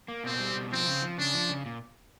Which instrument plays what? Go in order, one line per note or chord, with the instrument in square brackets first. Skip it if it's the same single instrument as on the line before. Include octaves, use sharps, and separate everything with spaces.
[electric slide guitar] A#3
[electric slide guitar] B2 [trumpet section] C4
[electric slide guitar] G3
B2
[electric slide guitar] F3 [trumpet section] C4
[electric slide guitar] C#3
F3
[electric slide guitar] C#3 [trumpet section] D4
[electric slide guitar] F3
C#3
A#2